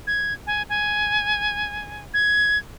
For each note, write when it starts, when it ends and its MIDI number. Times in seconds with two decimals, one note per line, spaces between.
0.07 0.34 92
0.47 0.62 80
0.69 2.03 80
2.14 2.58 92